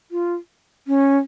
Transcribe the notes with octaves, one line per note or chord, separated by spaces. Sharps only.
F4
C#4